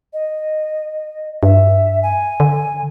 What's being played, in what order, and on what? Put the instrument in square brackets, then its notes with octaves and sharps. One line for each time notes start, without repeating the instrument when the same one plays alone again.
[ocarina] D#5
[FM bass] G2 [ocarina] E5
[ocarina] G#5
[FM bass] D3